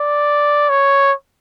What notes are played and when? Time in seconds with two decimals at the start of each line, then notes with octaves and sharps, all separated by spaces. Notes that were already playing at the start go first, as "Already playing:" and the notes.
Already playing: D5
0.70 C#5